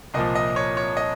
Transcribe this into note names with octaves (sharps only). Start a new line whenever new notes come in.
C2 A#2 F3 D#5
D#5
C#5
C#5
D#5